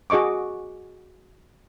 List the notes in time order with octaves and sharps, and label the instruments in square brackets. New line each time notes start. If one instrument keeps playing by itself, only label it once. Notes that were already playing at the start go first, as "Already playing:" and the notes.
[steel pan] F#4 G#4 D#5 C#6 D6